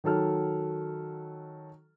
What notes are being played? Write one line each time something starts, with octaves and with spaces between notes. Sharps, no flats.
D#3 F#3 A4 F6